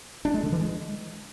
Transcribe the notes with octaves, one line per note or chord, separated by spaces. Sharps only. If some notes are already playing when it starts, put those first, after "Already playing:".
D4
G#3
D3
E3
G#3